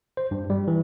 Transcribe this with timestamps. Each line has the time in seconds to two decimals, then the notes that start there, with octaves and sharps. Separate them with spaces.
0.17 C5
0.31 G2
0.50 G3
0.68 E3